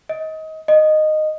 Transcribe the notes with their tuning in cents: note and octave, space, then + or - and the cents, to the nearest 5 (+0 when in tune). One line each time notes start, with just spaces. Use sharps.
D#5 +25
D#5 -10